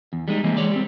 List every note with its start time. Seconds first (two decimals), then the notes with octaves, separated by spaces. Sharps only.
0.13 E2
0.28 G3 G#3 D#4
0.44 E3 G3 G#3 A#3 C4
0.57 G#3 C#5 D5
0.72 G3 C4